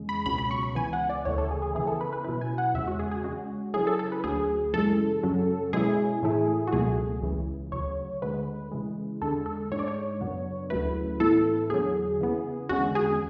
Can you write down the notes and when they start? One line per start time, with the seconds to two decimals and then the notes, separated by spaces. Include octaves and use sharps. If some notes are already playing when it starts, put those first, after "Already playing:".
Already playing: E2 C#3 G#3
0.09 B5
0.26 C#2 B2 F#3 C#4 B5
0.38 B5
0.51 C#6
0.63 B5
0.75 C#2 C#3 E3 B3 G#5
0.93 F#5
1.09 D5
1.25 D2 C#3 E3 A3 C#5
1.38 A4
1.51 G#4
1.62 G#4
1.75 C#3 E3 B3 E4 G#4
1.87 A4
2.01 B4
2.13 B4
2.24 B2 F#3 C#4 E4 B4
2.41 G#5
2.58 F#5
2.74 E2 C#3 G#3 C#4 E5
2.87 F#4
2.99 G#4
3.11 G#4
3.24 C#3 G#3 C#4 F#4
3.74 C#3 F#3 C#4 E4 G#4
3.87 A4
3.99 A4
4.12 B4
4.24 D2 D3 F#3 G#4
4.73 F#2 C#3 E3 G#3 A4
5.23 F#2 C#3 F#3 C#4
5.73 B2 G#3 C#4 E4 G#4
6.23 A2 E3 A3 E4
6.67 F#4
6.73 C#2 B2 F#3 A3 G#4
7.23 C#2 C#3 E3
7.72 D2 C#3 F#3 C#5
8.22 D2 D3 G#3 B4
8.72 C#3 E3 G#3
9.21 E2 D3 G#3 A4
9.46 A4
9.72 G#2 G#3 D4 C#5
9.79 D5
9.88 C#5
10.21 F#2 C#3 F#3 B3 D4
10.70 D2 C#3 F#3 A3 E4 B4
11.20 A2 E3 B3 E4 A4
11.70 E2 D3 F#3 G#4
12.20 C#3 E3 B3
12.69 E2 D3 G#3 C#4 F#4
12.95 G#4